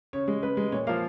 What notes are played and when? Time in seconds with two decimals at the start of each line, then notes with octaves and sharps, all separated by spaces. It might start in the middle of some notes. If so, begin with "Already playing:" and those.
0.13 C#3 C#5
0.28 G#3
0.42 C#3 B4
0.57 G#3
0.72 A#2 C#5
0.87 F3 A#3 F5